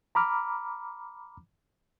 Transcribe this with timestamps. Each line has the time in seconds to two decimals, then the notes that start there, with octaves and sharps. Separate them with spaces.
0.15 A#5 B5 D6 F6